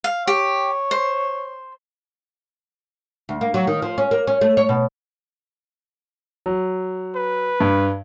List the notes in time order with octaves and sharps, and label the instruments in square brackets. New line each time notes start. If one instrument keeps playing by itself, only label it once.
[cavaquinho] F5
[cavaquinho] G4 [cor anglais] C#5
[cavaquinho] C5
[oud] D2
A#3
F#3
D#3
F3
C#4
A#3
C#4
A3
C#5
B2
[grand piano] F#3
[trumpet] B4
[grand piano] G2